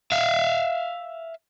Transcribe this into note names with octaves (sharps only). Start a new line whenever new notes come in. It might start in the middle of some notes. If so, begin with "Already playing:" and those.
E5 F5